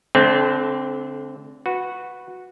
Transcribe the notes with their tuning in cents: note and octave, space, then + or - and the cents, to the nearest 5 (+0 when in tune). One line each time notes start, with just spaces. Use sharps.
D3 -25 A3 -40 C4 +0
F#4 -10 B4 +0